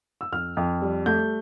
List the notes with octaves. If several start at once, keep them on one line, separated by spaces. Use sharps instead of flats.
E6
F2 F6
F2
G3
A3 G6